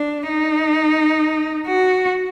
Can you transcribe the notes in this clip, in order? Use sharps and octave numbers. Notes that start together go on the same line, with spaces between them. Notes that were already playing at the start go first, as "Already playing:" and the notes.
Already playing: D4
D#4
F#4